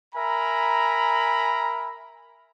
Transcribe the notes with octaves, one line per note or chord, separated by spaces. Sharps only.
A#4 E5 G#5 A#5 B5